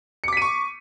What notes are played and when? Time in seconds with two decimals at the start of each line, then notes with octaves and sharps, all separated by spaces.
0.24 C#7
0.28 D6
0.33 B6
0.37 D#7
0.42 C#6